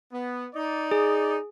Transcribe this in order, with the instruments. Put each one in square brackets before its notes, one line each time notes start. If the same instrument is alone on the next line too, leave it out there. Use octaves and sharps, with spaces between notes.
[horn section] B3
D#4 D5
[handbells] G#4